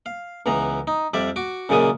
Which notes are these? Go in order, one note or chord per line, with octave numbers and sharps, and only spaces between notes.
F5
C#2 E3 B3 A#5
D#4
F2 G3 D5 E5
F#4 D6
F#2 A#2 C#3 G#3 A#3 D#6